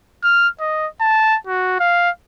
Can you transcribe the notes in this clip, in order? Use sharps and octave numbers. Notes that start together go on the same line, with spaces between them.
F6
D#5
A5
F#4
F5